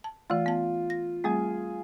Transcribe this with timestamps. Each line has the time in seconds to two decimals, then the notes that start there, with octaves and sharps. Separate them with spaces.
0.04 A5
0.30 E3 A3 F4
0.46 B3 A5
0.90 A#6
1.24 G3 A3 C4 G#4